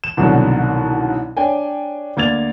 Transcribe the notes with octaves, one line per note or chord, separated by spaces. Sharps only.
E7
C2 G#2 B2 D3 D#3 F#3
D4 C#5 G5 G#5
D2 A#3 D5 G#6 A6 F7